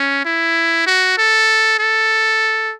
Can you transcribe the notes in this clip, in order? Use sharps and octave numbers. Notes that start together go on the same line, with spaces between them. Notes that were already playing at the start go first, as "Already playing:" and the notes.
Already playing: C#4
E4
F#4
A4
A4